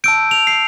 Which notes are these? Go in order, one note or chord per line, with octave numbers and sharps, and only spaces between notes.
A5 E6 G6 D7
F7
C7